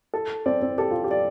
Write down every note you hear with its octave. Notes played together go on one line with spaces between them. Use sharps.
A4
C4 D5
C4
G4 A4
F4
G4
D5